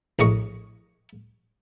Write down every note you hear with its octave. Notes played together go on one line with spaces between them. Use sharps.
A#1 A2 D#5 C#6